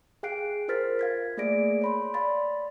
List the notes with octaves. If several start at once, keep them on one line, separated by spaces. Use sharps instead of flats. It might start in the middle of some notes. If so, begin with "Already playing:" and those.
G#4 F5 G5 F#6 C7 D7
F4 A#4 C5 F6 A6 B6
F5 G#6 B6
A3 A#3 G#4 D5 A#6 D7
C#5 B5 C6
D5 F5 B5 C6 A6